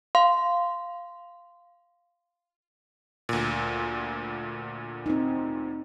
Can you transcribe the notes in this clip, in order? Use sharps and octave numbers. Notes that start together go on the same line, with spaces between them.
F5 C6
D2 A#2
C4 D#4